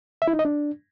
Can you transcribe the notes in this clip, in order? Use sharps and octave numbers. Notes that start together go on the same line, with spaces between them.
E5
E4
D#4
D#5
D4